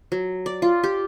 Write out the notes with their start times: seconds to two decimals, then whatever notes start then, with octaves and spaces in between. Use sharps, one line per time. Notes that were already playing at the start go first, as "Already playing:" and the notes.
0.12 F#3
0.46 D5
0.62 F4
0.84 G4